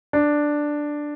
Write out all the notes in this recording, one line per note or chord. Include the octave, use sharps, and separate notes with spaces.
D4